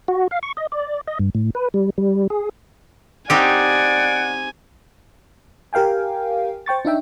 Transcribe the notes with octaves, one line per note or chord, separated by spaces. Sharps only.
F#4
F5
C#6
D#5
D5
D#5
G2
A2
B4
G3
G3
G#4
C4 D#4 G4 D5 F#5 G#5
G4 A#4 F5 G5 G#5
C5 G5 C#6 A6
D4 D#4 E5 G5